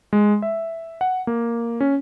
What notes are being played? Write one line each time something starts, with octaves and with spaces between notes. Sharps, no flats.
G#3
E5
F#5
A#3
C#4